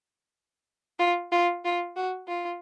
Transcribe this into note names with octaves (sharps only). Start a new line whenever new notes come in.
F4
F4
F4
F#4
F4